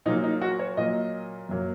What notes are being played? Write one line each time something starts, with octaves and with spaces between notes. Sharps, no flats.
A#2 F#3 A#3 D#4
D#4
F#4
C#5
A#2 F#3 A#3 D#5
F#2 F#3 A#3